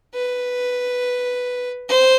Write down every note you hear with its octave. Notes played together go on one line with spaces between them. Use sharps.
B4
C5